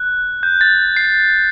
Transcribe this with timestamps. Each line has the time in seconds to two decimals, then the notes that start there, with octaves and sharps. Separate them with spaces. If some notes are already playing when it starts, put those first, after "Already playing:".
Already playing: F#6
0.43 G6
0.61 A6
0.97 C7